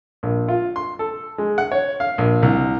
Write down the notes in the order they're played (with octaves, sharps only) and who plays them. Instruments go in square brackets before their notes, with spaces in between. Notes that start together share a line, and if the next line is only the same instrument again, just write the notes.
[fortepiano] A#1
F4
C6
A4
G#3
F#5
C#5
F5
A#1
C2